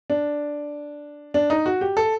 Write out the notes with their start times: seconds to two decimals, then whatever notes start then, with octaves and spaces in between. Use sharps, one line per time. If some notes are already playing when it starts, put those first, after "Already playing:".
0.10 D4
1.34 D4
1.50 D#4
1.66 F#4
1.81 G4
1.97 A4